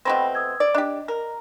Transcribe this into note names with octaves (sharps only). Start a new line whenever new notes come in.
B2 A3 C4 G5 B5 A#6
D#6 E6 G#6
D5
D4 G4 D#5
A#4